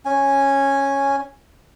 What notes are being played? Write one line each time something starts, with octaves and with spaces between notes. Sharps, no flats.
C#4 G#5